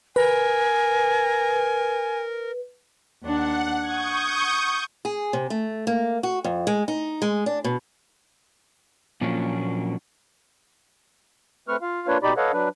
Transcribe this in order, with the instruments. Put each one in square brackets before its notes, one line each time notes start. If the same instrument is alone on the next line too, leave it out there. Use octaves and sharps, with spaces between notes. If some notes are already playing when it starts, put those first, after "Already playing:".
[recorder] A#4 [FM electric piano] B4 [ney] G#5
[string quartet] D#2 D4 [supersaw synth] F#5
[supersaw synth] C#6 D#6 G6 [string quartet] G#6
[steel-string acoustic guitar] G#4
C3
A3
A#3
F#4
F2
G#3
D#4
G#3
D4
B2
[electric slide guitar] A#2 F3 F#3 A#3 C#4 D4
[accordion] A3 C4 B4 C#6 F6
F4 F5
A#3 D4 F4 B4 C#5
B2 D#4 G4 D5 B5
A4 B4 C#5 D#5 F5 F#5
F#3 D4 B4